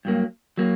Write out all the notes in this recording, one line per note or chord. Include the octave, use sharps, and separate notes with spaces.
G2 F#3 A#3
F#3 A#3